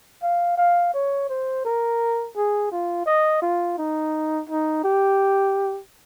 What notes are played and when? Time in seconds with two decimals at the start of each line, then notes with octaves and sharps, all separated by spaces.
0.23 F5
0.57 F5
0.94 C#5
1.29 C5
1.65 A#4
2.36 G#4
2.72 F4
3.06 D#5
3.42 F4
3.78 D#4
4.49 D#4
4.84 G4